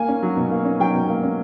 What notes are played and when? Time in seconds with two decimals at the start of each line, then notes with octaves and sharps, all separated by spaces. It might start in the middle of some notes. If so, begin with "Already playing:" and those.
Already playing: A#3 G#5
0.09 C#4
0.23 F#3
0.37 B2
0.51 A#3
0.65 C#4
0.80 F#3 G5
0.94 B2
1.09 A#3
1.23 C#4